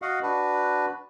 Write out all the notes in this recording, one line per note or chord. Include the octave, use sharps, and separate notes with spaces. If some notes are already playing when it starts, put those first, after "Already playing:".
F#4 D#5 F5 F#5
D4 F#4 B4